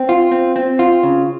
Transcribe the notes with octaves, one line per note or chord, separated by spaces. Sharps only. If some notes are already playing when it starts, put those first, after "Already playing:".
Already playing: C4
F4
C4
C4
F4
C#3